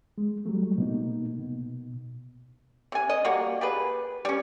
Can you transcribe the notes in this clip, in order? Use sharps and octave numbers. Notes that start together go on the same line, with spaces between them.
G#3
F#3 G3 A3
B2 A#3 D#4
B2
C3 G#5
D#5
G3 A#3 F#4
G4 G#4 B4
G3 C#4